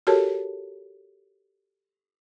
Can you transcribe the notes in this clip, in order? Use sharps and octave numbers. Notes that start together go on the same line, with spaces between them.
F#4 G4 A4 A#4 C#5 A5